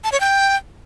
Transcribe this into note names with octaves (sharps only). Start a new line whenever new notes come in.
A5
C#5
G5